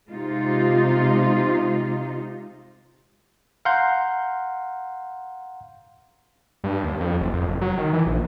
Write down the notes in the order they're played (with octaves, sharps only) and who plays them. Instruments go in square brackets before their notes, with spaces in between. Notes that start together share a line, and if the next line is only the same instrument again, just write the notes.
[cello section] C3 G#3 D#4 F4
[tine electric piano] F5 F#5 A#5 C6 G6
[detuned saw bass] G2
D#2
F2
F#1
F2
F#1
F#3
D#3
E3
A#1